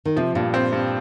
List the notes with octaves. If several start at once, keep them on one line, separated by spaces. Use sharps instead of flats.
D#3
C3 F3
G2 A#2
C4
G2